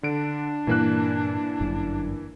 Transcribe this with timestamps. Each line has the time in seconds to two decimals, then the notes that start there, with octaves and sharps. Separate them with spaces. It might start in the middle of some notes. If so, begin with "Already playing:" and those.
0.03 D3 D4 D7
0.67 G2 A#2 E3 A#3 F#6
1.61 G1 F#2